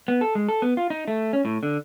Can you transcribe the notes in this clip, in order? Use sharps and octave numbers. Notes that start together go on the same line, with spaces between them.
B3
A4
G#3
A4
B3
F4
D#4
A3
C#4
A2
D3